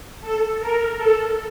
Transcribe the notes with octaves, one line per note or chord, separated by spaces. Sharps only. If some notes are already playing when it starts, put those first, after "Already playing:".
A4
A#4
A4